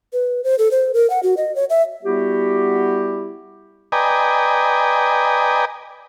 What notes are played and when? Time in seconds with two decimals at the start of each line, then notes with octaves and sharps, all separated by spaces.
0.13 B4
0.44 C5
0.59 A4
0.71 C5
0.94 A#4
1.10 F#5
1.23 F#4
1.37 D#5
1.56 C#5
1.70 E5
2.04 G3 B3 E4 F#4 G4
3.92 B4 D5 D#5 G5 G#5 A#5